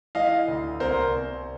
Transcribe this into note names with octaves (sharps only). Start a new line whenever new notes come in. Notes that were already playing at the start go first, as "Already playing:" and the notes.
E3 D#5 F5
D2
C2 A#4 C5
C2